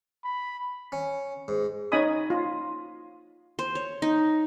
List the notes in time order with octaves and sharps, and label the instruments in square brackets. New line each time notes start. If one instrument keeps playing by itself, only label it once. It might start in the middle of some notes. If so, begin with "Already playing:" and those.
[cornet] B5
[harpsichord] C#4
G#2
[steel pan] C#4 D#4 D#5 G#5 B5 D#6
F4
[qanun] C5
C#5
D#4